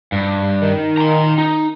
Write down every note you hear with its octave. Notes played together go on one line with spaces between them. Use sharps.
G2
D#3
A#5 C6
D#4